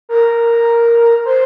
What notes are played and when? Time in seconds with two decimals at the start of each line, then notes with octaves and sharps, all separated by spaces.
0.09 A#4
1.26 C5